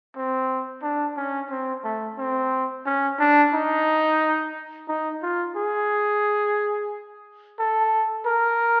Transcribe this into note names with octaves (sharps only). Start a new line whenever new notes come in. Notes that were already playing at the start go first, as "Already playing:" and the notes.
C4
D4
C#4
C4
A3
C4
C#4
D4
D#4
D#4
F4
G#4
A4
A#4